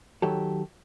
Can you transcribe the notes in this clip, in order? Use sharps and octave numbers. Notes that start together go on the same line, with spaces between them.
D#3 F#3 G4 A4